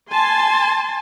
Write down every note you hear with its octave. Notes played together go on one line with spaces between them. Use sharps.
G#5 A5 C6